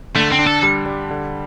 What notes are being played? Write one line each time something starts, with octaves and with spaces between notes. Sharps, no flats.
D3 A3
C4
D4
A4
G3
G3
D3